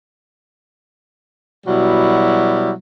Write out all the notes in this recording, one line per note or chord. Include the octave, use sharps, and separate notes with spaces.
B2 F#3 G3 E4